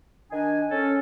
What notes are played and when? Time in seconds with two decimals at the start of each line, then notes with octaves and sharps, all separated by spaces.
0.31 D#3 D4 G#5
0.71 C#4 A4